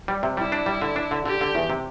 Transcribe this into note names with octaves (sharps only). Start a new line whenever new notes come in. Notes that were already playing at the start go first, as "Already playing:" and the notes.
G3
C3
G3 E4
D4
G3
D3
D4
D3
D3 G4
D3
E2
C3